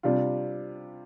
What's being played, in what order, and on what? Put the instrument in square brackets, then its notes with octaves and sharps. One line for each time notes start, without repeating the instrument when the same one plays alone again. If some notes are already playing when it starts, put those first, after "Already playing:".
[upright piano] C3 G3 D4 F4